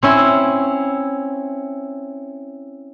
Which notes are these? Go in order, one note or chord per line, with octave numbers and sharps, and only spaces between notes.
C4 C#4 E4